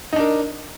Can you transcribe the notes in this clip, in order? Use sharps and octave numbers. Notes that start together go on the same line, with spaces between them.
D4 D#4 A#4